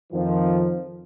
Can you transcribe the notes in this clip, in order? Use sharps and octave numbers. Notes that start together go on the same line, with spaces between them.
F2 D#3 F3